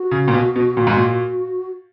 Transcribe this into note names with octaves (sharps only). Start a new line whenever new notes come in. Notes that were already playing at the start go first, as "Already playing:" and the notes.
Already playing: F#4
C#3
A#2
B2
B2
A#2
G#2
A#2